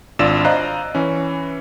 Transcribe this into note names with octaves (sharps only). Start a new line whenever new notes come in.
G#1 D4 F4 D5 E6 E7
C5 D5 D#5 F5 A#5 F#6
E3 C#4